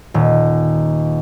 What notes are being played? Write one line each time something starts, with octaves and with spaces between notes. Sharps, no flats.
D#1